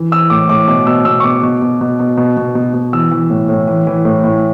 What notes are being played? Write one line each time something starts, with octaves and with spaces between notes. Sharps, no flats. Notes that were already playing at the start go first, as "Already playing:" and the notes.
Already playing: E3
E3 E6
A2 D6
A2 D6
B2 D6
B2 E6
B2 E6
C#6
B2 D6
B2
B2
B2
B2
B2
B2
B2
B2
E3 E6
E3
A2
A2
E3
E3
A2
A2